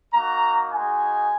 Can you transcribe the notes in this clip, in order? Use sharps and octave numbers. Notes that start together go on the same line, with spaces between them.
A#3 D#4 F#4 A#5
G#3 D#4 F#4 G#5